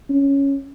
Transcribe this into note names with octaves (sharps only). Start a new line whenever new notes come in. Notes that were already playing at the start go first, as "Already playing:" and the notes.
C#4